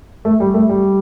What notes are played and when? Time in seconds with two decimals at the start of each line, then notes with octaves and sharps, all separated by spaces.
0.25 A3
0.40 G3
0.54 A3
0.69 G3